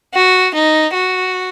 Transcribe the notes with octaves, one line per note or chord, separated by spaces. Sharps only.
F#4
D#4
F#4